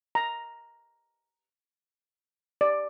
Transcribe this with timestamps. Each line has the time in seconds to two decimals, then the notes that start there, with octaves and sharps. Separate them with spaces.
0.15 A#5
2.61 D5